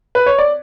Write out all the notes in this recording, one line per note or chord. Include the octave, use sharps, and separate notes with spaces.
B4
C#5
D5